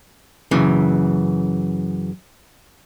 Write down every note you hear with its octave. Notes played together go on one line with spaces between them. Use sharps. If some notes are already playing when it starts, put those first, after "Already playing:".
F#2 C#3 E3